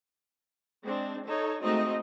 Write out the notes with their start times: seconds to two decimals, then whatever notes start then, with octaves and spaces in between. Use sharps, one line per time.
0.81 G#3 C4 D4
1.25 D#4 A4 C#5
1.61 G#3 A3 C4 D#4 F#4 D#5